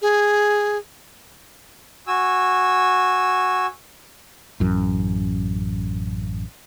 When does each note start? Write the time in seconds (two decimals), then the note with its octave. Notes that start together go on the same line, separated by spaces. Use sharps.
0.02 G#4
2.07 F#4 G#5 E6
4.60 A1 F#2